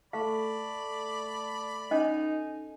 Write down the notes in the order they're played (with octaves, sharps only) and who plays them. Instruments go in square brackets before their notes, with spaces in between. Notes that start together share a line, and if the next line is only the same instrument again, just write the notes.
[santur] A3 [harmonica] D5 B5 [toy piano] F5
[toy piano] C#4 D#5 [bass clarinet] D#4 [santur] G#5